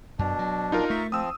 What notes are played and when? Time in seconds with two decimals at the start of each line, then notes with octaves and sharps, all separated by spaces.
0.19 F#2 B2 D4
0.39 F#3
0.72 D#4 F4 A#4
0.90 A3 E5 C#6
1.12 F3 C4 D#6 E6